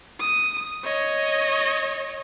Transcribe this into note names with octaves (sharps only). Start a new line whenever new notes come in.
D#6
C#5 D#5